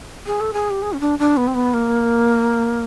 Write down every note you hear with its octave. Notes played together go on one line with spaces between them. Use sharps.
G#4
A4
G#4
G4
G#4
C#4
D4
D4
B3
C4
B3
A#3